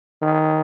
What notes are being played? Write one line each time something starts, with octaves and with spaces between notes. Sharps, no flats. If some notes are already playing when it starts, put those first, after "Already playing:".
D#3